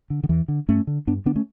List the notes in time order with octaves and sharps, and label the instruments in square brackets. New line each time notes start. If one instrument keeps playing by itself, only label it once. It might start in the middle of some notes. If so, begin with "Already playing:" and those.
[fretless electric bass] D3
D3
E2 E3
D3
G2 A3 C#4
D3
G2 B3 D4
D3 B3 D4
A3 C#4